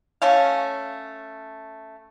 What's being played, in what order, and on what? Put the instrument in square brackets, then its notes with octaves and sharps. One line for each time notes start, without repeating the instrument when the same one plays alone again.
[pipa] A3 C#4 F5